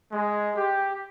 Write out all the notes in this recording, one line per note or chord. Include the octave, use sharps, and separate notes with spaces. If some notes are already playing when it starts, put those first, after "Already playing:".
G#3
G4